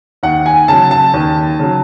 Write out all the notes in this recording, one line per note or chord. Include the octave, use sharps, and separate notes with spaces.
D#2 F#5
G#5
C#3 F#3 A5
A5
D#2
C#3 F#3